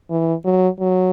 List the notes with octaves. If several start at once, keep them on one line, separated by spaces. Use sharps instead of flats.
E3
F#3
F#3